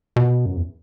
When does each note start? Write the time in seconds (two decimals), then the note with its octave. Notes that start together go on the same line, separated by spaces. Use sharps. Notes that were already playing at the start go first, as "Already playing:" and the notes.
0.16 B2
0.46 F#2
0.56 E2